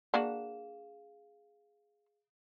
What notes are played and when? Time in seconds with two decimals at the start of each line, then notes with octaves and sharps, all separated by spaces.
0.14 A#3 D4 F#4 G#4 F5 E7